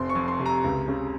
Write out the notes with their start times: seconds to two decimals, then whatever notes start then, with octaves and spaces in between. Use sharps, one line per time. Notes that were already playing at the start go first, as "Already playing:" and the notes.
Already playing: F1 C4 C6
0.09 C#6
0.15 F2
0.28 C6
0.39 C3
0.46 A#5
0.64 C#2
0.88 C#3